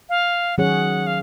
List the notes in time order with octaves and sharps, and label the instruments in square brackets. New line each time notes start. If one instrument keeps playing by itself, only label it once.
[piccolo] F5
[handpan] D#3 F#3 C#4 G#4 C#5 [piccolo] F#5
[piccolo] F5